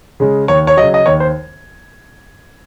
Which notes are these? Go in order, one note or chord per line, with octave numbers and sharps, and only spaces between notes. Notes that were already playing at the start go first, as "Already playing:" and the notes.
C#3 G#3
D#2 C#5
C#5
C#3 F#3 D#5
D#5
D#2 C#5
C5